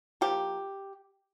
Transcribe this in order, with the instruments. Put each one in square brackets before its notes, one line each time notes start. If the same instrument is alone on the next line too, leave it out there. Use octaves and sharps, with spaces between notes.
[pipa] F3 A#3 G4